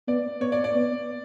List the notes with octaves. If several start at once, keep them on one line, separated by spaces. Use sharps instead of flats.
B3 D5
B3 C#5
D5
D5
B3